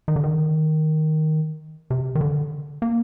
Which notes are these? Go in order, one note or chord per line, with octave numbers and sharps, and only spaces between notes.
D#3
D3
D#3
C3
D#3
D3
A#3